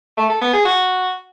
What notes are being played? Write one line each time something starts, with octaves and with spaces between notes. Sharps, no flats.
A3
A4
B3
G#4
F#4